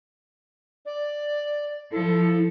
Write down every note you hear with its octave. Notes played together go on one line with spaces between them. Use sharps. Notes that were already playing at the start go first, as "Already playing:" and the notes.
D5
F3 E4 A4